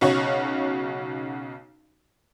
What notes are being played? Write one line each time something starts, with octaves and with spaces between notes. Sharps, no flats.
B1 C#3 F#4 C#5